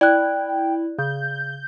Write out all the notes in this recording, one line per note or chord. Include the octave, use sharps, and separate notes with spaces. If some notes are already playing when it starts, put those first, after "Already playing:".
E4 D5 G5 F#6
C#3 G6